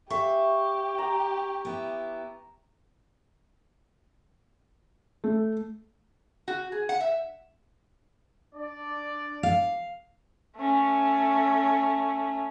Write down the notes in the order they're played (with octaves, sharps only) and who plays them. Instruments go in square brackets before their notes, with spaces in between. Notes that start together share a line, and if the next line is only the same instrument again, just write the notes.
[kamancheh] G4 [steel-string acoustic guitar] E5 F5 [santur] C#6
[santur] A#5
[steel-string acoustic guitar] B3 E4
[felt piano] A3
[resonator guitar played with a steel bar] F#4
G#4
F#5
E5
[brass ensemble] D4 D5
[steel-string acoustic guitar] F5
[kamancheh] A3 C#4